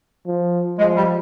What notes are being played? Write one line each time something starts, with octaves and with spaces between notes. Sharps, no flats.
F3
F3 G#3
G3